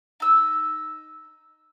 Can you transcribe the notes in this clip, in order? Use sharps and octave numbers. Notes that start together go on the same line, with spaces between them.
D#4 E6